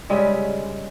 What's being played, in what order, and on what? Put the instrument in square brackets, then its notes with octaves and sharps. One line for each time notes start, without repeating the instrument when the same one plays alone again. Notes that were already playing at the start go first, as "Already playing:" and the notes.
[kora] C#3 G3 G#3 E5